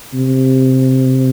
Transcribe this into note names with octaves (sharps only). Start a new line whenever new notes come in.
C3